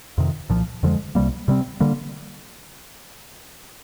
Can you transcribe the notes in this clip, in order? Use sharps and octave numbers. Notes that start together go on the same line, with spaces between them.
F2 C3 D#3
C2 A#2 F3
F2 D3 F3 G#3
C2 C3 G3 A#3
C3 G3 C4
D3 G3 A#3